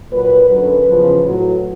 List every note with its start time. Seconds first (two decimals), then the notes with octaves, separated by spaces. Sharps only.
0.12 A#2 F#3 B4
0.50 F#2 D3 F#3 B4
0.88 E2 C#3 F3
1.25 A2 F#3